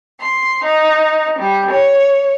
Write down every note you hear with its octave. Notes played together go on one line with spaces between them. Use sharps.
C6
D#4
G3
C#5